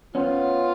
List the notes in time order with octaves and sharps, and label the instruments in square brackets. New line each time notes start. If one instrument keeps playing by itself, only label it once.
[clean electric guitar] B3 C#4 [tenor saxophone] F4